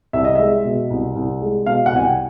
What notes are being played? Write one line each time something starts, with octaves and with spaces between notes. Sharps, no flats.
C2 E5
D#5
G#3 E5
B2
C2
C2
G#3
B2 F5
F#5
C2 G#5
G5